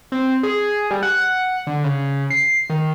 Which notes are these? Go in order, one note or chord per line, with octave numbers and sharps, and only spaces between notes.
C4
G#4
G3
F#5
F#5
D3
C#3
C7
D#3